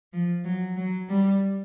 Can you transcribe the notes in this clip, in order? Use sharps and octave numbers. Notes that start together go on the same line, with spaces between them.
F3
F#3
F#3
G3